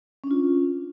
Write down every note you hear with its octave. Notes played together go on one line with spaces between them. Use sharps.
C#4 D4 F4